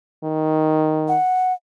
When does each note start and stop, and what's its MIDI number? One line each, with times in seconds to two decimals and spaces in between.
0.24 1.15 51
1.08 1.53 78